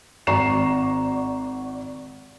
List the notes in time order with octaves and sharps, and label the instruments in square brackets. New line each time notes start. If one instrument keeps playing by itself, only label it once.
[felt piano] G#1 D5 A#5 C#6 C7 E7